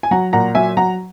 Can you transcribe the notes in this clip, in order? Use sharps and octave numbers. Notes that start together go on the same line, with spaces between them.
G#5
F#3 F#5 A#5
A#2 F#5 A#5
F#3 E5 G#5
F#3 F#5 A#5